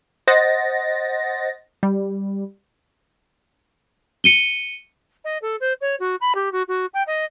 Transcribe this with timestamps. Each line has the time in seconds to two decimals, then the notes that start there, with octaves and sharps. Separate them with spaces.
0.28 C5 D#5 F#5 A6 A#6
1.83 G3
4.24 C#7 D#7 G7
5.24 D#5
5.42 A4
5.60 C5
5.81 C#5
5.99 F#4
6.21 B5
6.35 G4
6.52 F#4
6.68 F#4
6.93 G5
7.07 D#5